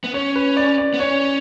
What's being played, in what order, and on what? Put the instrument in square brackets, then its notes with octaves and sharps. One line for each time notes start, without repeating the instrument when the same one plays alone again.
[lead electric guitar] B3
[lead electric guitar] C#4 [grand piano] C#5
[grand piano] B4
D5
D5
[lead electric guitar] B3
[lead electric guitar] C#4 [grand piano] C#5